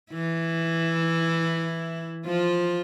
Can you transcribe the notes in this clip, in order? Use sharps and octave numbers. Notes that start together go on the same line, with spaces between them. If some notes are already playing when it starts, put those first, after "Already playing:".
E3 E4
F3 F4